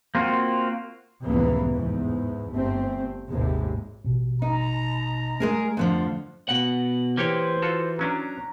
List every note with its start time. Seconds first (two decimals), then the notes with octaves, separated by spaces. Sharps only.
0.15 A#3 C4 F4 F#4
1.25 F1 C#2 A2 E3 A#3 B3
1.75 E2 G#2
2.51 G1 A3 C4
3.29 G#1 D#2 C3 G#3
4.05 A1 B2
4.42 D#4 A#5
5.40 G#3 A3 G#4 A#4
5.77 F2 D3 F3
6.49 B2 F#5
7.17 E3 A#3 G4 C5 C#5
7.62 F4 F#4 A4
7.99 F#3 C#4 D4 A#5